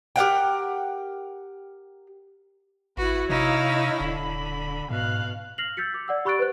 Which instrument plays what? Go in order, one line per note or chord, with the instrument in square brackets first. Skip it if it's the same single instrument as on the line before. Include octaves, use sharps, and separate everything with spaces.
[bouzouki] G4 A#4 F#5 G5
[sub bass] G#1 [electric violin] E4 B4 [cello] F#4
[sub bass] C3 [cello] D#4 E4 [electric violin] C#5 F5
[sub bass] D#1 [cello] D3 [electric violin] B5
[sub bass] G#2 [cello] B2 [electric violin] F5 F#6
[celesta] F6 A#6 C7 F7 F#7
E6 G6 A6 B6 C#7
D6
D5 F#5 E6
G4 B5 C#6 F#6 A6 D7
B4 C5 F#6